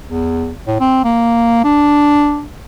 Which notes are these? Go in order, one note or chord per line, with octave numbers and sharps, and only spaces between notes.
E2
A2
C4
A#3
D4